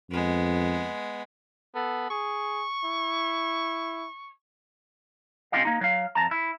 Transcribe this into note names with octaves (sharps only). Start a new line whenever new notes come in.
F2 G#3 B3
B3 A4
G#4 C#6
E4
C4 C#4 F4 G4 D#5 F5
A#3 D#4
F#3 F5
F2 A5 A#5
E4